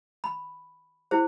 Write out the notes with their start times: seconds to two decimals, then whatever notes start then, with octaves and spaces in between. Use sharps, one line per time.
0.24 B5
1.11 E4 G#4 C5